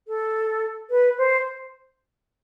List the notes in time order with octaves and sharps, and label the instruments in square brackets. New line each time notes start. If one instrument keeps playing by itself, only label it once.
[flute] A4
B4
C5